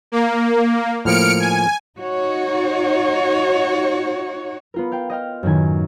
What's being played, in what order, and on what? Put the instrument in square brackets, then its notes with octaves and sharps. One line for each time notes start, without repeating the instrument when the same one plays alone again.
[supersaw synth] A#3
[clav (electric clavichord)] A2 F3 A#3 [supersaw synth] F6 C#7 D7
[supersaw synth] G#5
[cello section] D#4 F#4 C#5
[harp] B3 F4 A#4
F5 G5
D#5 G5 F6
F#2 A2 D#3 G#5